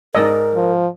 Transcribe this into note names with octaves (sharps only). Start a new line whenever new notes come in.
G#2 A#4 D5 D#5 E6
F3